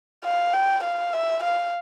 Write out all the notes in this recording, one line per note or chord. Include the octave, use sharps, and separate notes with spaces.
F5
G5
F5
E5
F5